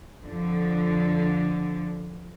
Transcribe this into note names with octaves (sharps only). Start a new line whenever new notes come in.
F2 D3 F3